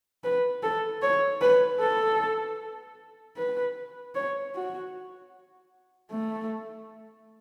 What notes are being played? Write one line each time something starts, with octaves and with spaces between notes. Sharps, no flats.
B4
A4
C#5
B4
A4
B4
C#5
F#4
A3